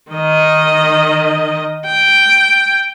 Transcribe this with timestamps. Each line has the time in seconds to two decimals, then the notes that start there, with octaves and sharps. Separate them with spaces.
0.11 D#3 D#5
1.85 G5